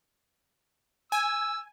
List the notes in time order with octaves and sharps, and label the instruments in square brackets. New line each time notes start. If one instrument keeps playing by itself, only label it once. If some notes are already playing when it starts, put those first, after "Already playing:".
[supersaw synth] G#5 [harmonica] E6